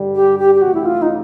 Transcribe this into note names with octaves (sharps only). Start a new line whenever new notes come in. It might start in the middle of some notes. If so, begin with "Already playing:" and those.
Already playing: G2 D3 G3
G4
G4
G4
F2 C3 E3 A3 C#4 F#4
E4
F4
D#4